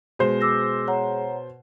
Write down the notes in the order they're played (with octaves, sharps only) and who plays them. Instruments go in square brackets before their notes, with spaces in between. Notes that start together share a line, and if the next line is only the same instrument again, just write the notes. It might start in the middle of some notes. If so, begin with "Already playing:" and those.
[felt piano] B2 C5 [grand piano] G#3
[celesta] D6 E6 A#6
C#5 F#5 A#5